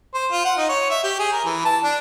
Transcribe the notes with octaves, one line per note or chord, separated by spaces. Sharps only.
C5
F4
F#5
D#4
C#5
E5
G4
G#4
A#4
E3
A5
D4